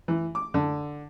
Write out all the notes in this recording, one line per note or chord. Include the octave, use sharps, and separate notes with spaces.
E3
D6
D3